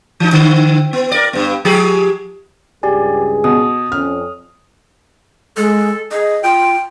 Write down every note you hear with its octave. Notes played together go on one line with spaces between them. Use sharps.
E3 D#4
D3
B3
A#4 D5
G2 B3
F3 G4 G#4
C#2 G2 G4 G#4 D5 G#5
B2 D#6
F2 C#4 F6
G#3 A4
G#4 D#5
F4 G5